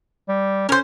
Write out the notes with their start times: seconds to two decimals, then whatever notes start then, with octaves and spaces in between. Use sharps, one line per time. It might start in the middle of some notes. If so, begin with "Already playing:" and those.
0.29 G3
0.69 C#4 A#4 C5